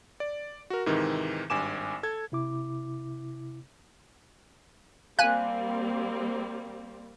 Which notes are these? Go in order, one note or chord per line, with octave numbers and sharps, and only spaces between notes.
D5
F#4 A#4
G#2 C3 D#3 E3
G#1 G2 G#5 D6 E7
A4 G#6
C3 E4 D6
G3 A#3 C4 F5 G#5 F#6